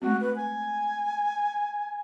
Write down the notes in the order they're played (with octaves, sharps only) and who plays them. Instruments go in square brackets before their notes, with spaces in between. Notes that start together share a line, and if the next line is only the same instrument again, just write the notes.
[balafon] G#3 A3 C4 [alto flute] F#4
[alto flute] B4
G#5